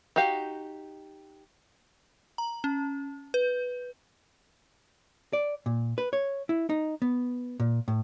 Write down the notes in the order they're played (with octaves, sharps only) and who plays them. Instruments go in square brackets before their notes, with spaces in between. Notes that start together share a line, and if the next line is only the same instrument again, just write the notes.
[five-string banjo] D#4 F#4 G4 F5
[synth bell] A#5
C#4
B4
[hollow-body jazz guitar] D5
A#2
B4
C#5
E4
D#4
B3
A#2
A2